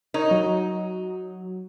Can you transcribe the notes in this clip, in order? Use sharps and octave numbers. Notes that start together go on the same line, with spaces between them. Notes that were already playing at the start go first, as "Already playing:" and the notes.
D#4 A#4 C#5
F#3